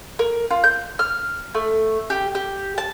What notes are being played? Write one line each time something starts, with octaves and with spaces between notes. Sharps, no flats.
A#4
F4
G6
F6
A3
G4
G4
A5